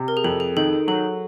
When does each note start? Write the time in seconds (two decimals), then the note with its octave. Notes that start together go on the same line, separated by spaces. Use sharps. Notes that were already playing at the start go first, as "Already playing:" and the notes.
Already playing: C3
0.08 A#4
0.17 G#4
0.24 F2 A4
0.40 G#4
0.57 D#3 A4
0.88 F#3 A4